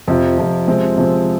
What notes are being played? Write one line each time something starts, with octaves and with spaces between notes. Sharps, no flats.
F2 C3 F3
F2 C3 F3
C3 F3 G#3 C4
C3 F3 G#3 C4